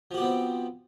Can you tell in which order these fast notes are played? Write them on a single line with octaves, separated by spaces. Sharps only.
F3 F#4 G4 B3 C4